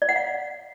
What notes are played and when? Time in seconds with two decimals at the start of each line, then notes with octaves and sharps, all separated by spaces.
0.02 D5
0.09 F#5
0.16 F5